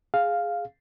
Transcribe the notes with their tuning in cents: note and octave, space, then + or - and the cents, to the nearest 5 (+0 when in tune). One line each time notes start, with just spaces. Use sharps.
G#4 +0 F5 +0